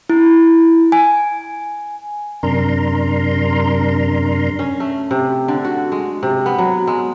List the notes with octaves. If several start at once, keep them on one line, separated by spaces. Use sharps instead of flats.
E4
G#5
F#2 C3 D4 A#4 A#5 C6
C#4
A3
C3
D3
F#4
G#3
C3
B3
F#3
G#3